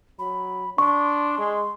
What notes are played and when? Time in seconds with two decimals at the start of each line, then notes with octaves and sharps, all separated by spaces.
0.19 F#3 B5
0.78 D4 C6 C#6
1.38 G#3